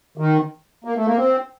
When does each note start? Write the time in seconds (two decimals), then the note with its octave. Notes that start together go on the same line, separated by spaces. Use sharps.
0.18 D#3
0.84 A#3
0.96 A3
1.06 A#3
1.17 C4